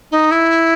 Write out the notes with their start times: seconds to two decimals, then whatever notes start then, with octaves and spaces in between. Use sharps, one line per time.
0.11 D#4
0.31 E4